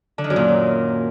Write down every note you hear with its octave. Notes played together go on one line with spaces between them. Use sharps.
D3
D#3
F#2
A#2